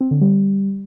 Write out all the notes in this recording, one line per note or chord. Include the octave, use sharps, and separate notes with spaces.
C4
D3
G3